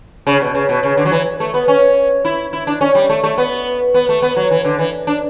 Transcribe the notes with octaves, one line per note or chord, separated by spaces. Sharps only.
C#3
B2
C#3
B2
C#3
D3
F#3
E3
A3
B3
C#4
E4
E4
D4
C#4
G3
A3
A3
B3
B3
A3
B3
F#3
E3
D3
E3
D4